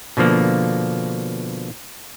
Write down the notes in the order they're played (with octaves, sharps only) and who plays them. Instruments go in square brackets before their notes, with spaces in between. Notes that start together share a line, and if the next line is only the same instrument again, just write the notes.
[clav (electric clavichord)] B2 D3 F3 A#3